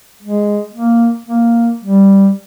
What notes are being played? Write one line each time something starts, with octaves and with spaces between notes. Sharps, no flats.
G#3
A#3
A#3
G3